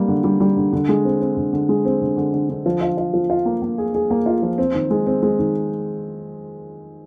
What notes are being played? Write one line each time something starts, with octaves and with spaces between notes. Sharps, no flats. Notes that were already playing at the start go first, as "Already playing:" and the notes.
Already playing: G3 A#3
D3
G3
G3
D3
D3
G#3
C4
C4
D3
D3
G#3
C4
D3
D3
D3
D3
F3
F4
F4
F3
F4
A#3
A#3
G#4
G#4
A#3
F4
F3
C4
D#3
G#3
C4
G#3
D#3